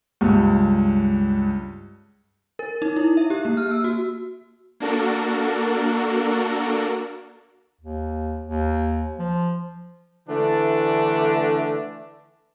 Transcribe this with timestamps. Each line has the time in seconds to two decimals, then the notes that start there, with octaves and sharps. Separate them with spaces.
0.21 C#2 G2
2.59 A#4
2.82 D#4
2.96 E4
3.17 E5
3.30 G4
3.45 A#3
3.57 F6
3.71 E6
3.84 F#4
4.80 A#3 D4 F#4 A4 A#4
7.81 D#2
8.47 D#2
9.19 F3
10.29 D3 E3 A3 D4